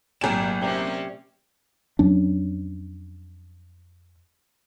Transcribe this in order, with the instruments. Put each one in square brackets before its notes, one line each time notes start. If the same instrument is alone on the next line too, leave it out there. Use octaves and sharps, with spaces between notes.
[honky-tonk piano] G#1 G#5 E7 [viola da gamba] A#2 F#3 A3 [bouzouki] G3 A#4
[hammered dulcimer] C3 D5 [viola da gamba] C4 C#4
[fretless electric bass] F2 F#3 C#4 D4